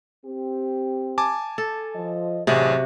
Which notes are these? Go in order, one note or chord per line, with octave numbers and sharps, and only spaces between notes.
C4 G4
G#5 A5 D6
A4
F3 D#5
A1 C3 F#3 F#4 G#4